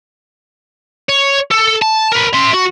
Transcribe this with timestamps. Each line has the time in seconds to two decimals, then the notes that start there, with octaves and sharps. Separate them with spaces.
1.09 C#5
1.51 A4
1.82 A5
2.13 A#4 B4
2.34 E5 C6
2.54 F#4